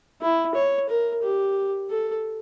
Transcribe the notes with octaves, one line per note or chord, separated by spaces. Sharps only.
E4
C#5
A#4
G4
A4